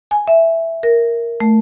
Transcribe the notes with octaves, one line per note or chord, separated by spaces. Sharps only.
G#5
E5
A#4
A3